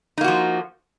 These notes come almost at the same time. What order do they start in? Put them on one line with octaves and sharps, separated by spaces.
D#4 A#3 F#4 F3